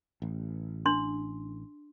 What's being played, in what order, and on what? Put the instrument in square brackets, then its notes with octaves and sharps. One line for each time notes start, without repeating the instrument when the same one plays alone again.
[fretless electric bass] A1
[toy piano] D4 C6